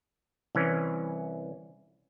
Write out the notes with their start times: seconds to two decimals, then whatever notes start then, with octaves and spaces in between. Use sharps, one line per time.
0.55 C2 E3 C#4